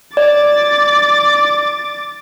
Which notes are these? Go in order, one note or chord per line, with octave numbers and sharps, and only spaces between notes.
D5 D6 A6